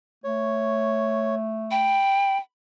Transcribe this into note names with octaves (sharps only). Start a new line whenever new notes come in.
A3 C#5
G5 B5